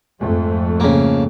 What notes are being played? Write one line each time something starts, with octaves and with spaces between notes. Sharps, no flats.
F2 G#2 A3
C#3 A#3